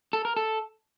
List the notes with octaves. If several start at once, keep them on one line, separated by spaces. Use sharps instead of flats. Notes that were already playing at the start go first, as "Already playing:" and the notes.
A4
A#4
A4